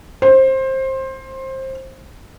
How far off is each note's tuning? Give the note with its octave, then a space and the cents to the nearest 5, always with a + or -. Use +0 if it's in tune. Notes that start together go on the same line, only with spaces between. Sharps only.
C5 +20